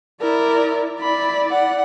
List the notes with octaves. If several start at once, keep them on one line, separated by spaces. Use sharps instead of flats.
E4 A#4 D5
E4 D5 B5
F#5